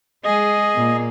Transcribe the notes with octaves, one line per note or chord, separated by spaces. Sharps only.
G#3 G#4 D#5
A#2 A#3